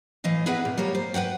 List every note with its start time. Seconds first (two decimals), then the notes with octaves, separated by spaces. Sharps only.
0.24 A2 E3 D#5 F5
0.46 B3 E4 G#4 B4 E5 F#5
0.65 A#2
0.78 G3 A#3 C#5
0.95 C5
1.14 B4 D5 F#5 G5